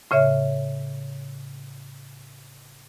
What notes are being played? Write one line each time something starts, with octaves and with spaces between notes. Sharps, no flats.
A2 C#3 C#5 E5